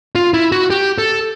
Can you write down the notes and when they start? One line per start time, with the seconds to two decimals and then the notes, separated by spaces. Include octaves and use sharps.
0.15 F4
0.34 E4
0.52 F#4
0.70 G4
0.98 A4